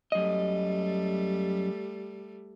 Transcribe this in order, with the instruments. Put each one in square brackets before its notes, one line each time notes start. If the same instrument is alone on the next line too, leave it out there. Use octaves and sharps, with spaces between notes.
[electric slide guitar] F#2 D#5 [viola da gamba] G3 A3